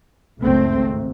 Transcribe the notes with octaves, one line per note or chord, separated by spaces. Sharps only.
F#1 C#2 A3 C4
G#1